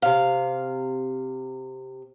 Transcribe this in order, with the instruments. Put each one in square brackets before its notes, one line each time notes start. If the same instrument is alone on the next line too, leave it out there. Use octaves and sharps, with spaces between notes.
[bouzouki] C3 F5